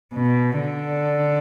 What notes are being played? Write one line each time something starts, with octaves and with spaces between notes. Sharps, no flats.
B2
D3